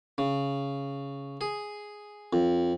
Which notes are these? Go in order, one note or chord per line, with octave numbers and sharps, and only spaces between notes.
C#3
G#4
F2